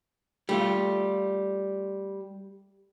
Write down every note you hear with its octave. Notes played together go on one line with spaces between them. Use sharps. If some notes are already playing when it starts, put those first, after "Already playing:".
G3 A3 F4